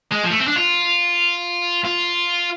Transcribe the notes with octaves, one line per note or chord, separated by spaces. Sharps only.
G#3
F3
A3
C4
D4
F4
F4